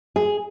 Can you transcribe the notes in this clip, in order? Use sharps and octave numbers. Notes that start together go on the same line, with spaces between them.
G#4